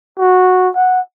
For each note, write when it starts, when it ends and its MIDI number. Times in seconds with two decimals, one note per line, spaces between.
0.19 0.69 66
0.75 1.00 78